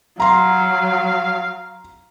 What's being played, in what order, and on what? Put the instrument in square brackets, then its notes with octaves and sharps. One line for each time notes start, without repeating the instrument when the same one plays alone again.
[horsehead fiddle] F#3 [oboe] F5 [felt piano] A#5 C6